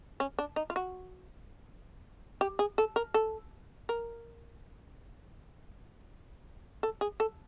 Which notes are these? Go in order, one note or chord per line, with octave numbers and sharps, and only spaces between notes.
C#4
D4
D#4
F4
F#4
G4
G#4
A4
A#4
A4
A#4
A4
G#4
A4